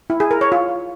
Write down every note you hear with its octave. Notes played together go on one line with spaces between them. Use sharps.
E4
G#4
A#4
C#5
F4